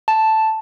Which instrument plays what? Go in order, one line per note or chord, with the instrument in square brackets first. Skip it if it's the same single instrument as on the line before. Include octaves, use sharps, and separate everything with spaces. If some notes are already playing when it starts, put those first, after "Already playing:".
[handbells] A5